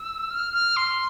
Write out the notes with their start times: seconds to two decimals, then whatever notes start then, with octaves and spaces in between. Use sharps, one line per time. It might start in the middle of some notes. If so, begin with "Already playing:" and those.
Already playing: E6
0.31 F6
0.54 F6
0.76 C6